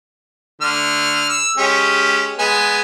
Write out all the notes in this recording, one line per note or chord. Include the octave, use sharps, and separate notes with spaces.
D3 A3 F6
E6
G#3 C#4 G4
G#3 B3 G#5